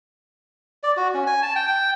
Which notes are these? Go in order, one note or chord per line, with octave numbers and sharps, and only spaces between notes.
D5
F#4
C#4
G#5
A5
G5
G5